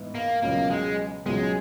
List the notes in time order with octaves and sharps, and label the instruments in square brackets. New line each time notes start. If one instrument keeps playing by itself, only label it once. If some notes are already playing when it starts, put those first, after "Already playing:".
Already playing: [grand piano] G#2 E3 B3 E4
[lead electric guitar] A#3
[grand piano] C#2 B2 F#3 C#4 [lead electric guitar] A#3
[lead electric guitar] G#3
[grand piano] C#2 B2 F#3 C#4 [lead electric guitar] G#3